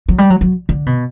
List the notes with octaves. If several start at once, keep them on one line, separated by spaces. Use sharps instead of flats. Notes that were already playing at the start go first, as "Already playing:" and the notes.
F#3
G3
F#3
F#3
D3
B2